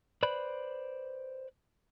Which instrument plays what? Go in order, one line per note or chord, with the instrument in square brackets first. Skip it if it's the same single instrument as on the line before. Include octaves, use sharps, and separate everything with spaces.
[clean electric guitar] B4 C5 D5 B5